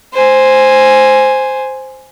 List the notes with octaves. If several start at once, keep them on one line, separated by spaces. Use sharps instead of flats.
C5 G#5